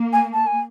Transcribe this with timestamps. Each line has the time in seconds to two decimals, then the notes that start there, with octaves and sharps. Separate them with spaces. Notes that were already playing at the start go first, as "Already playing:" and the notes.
Already playing: A#3
0.13 G#5
0.34 A5
0.47 G#5